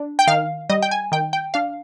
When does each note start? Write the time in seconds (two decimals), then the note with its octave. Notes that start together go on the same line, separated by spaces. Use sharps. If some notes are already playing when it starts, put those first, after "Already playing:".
Already playing: D4
0.19 G5
0.27 D#3 F5
0.69 G3 D#5
0.82 G5
0.91 G#5
1.12 D#3 G5
1.33 G5
1.54 D4 F5